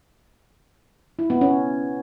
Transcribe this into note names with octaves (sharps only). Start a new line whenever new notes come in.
E4
B3
C#4